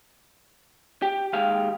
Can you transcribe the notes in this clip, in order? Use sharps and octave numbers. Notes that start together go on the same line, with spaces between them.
G4
D#2 G#3 G4 F5